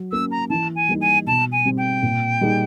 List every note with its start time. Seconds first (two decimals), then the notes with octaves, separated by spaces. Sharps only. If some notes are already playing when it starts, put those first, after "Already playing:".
Already playing: F#3
0.12 A#3 C#4 E6
0.31 A#5
0.50 E3 A5
0.76 G#5
0.89 G3 A#3 D#4
1.01 G#5
1.27 B2 A5
1.52 G#5
1.65 G3 C4
1.78 G5
2.03 A#2
2.41 G3 A#3 D#4 G#4